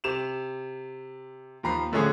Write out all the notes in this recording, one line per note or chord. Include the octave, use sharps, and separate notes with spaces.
C3 E7 F7
D#2 F3 A#5 B5 C7
A2 D3 F3 A3 C#4 G#4